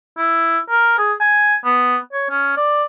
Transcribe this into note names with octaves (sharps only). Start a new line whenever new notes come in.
E4
A#4
G#4
G#5
B3
C#5
C#4
D5